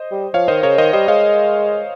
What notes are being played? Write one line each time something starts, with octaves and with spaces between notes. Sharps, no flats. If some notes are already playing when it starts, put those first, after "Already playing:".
Already playing: C5 D#5
G3
F3 C#5 F5
D#3 C5 D#5
C#3 A#4 C#5
D#3 C5 D#5
G3 C5 D#5
G#3 C#5 F5